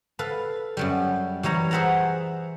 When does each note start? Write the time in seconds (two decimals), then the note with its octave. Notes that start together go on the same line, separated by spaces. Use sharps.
0.19 A4 B4 F5
0.77 F#2 F#3 G3
1.43 E3 G3 C#5 A#5
1.71 G#4 C5 E5 F#5 A5 A#5